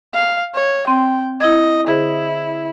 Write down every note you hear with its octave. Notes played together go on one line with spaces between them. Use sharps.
F5
C#5
C4 G5 C6
E4 D#5 G#6
D3 E4 G#4 C5